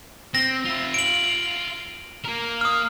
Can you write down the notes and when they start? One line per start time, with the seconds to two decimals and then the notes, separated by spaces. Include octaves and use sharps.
0.35 C4 A#6
0.65 F4 E5
0.94 D7 F#7
2.25 A#3 A#4
2.61 D#6 F6